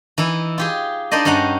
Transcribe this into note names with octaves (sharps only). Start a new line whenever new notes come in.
E3 D#4 E4
F4 G4 G#4
D4 D#4 C5 D5 D#5
G2 C#4 D#4 F#5 A#5